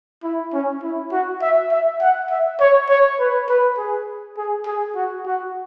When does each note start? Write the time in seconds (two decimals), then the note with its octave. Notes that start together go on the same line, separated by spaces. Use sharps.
0.23 E4
0.53 C#4
0.83 E4
1.12 F#4
1.41 E5
1.71 E5
2.01 F#5
2.30 E5
2.60 C#5
2.89 C#5
3.19 B4
3.48 B4
3.77 G#4
4.37 G#4
4.66 G#4
4.96 F#4
5.26 F#4